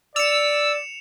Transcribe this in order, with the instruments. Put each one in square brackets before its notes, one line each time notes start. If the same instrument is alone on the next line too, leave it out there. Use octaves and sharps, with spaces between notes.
[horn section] D5 [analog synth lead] E6 [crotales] C#7 E7 F7